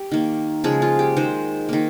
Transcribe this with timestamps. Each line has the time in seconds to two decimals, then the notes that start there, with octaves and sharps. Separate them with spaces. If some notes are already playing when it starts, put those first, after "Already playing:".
Already playing: G4
0.11 D#3 A#3
0.64 C#3 F3 G#3 G#4
0.82 F4
0.99 G4
1.16 D#3 G#3 C5
1.69 D#3 A#3